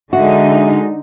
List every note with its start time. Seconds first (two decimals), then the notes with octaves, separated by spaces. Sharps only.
0.13 D3 G#3 D#4 F#4 E5